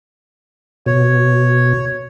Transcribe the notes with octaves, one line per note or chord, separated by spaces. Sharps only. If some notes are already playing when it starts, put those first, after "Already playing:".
B2 C#5